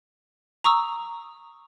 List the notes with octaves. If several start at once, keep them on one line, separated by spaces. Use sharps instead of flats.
A#5 C#6 D#6 E6